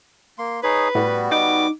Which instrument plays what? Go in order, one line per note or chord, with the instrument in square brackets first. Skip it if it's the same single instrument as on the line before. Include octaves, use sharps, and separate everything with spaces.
[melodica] A#3 C6
[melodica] D#4 G#4 C#5 [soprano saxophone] B4
[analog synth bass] A2 [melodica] G3 B3 F#4
[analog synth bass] D#4 [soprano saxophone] D6